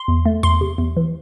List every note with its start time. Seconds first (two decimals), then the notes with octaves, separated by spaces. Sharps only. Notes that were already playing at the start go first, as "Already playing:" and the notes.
Already playing: C6
0.08 E2
0.26 A3
0.43 E2 C6
0.61 C3
0.78 E2
0.97 E3